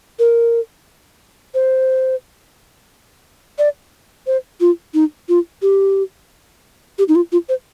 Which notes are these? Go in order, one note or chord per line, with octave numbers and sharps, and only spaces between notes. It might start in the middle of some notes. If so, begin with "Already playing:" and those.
A#4
C5
D5
C5
F4
D#4
F4
G4
G4
D#4
F4
F4
C5